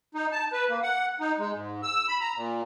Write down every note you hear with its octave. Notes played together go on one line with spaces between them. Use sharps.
D#4
A5
B4
A#3
F#5
D#4
G#3
G#2
E6
B5
A#5
A#2